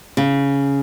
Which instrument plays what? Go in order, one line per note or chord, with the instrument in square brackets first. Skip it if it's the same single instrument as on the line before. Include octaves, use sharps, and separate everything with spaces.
[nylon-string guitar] C#3